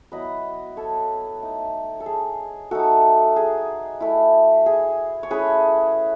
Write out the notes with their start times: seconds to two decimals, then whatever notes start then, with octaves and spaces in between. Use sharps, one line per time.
0.12 F#3 B3 E4 B4 D#5
0.77 A4 C#5
1.42 A3 D#4
2.00 A4
2.06 G#4
2.71 A3 D#4 F#4 A4
3.36 G#4
4.00 A3 E4
4.66 G#4
5.23 C#5
5.30 A3 C#4 E4 G#4 B4